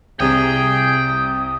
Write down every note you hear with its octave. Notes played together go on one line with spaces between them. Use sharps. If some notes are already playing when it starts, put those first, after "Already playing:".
C2 C3 G#4 G5 D#6